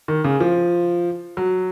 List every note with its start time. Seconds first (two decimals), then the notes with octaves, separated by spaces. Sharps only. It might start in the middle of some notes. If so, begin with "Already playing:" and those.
0.08 D#3
0.24 C#3
0.40 F3
1.37 F#3